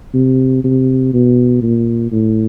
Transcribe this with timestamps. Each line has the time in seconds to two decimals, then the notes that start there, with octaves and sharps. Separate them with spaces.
0.14 C3
0.64 C3
1.14 B2
1.62 A#2
2.12 A2